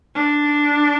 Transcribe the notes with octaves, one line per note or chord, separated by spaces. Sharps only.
D4